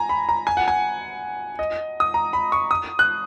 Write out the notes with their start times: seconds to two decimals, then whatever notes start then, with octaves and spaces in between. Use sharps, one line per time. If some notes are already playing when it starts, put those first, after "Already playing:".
Already playing: G#5 A#5
0.09 B5
0.29 A#5
0.47 G#5
0.57 F#5
0.68 G#5
1.59 D#5
2.00 D#6
2.14 A#5
2.33 B5
2.52 C#6
2.71 D#6
2.99 F#6